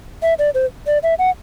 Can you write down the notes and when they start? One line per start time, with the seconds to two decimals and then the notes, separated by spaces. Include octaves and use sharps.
0.22 E5
0.39 D5
0.54 C5
0.87 D5
1.03 E5
1.19 F#5